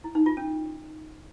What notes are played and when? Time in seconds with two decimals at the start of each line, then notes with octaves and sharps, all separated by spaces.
0.04 E4
0.15 D#4
0.26 F4
0.37 C#4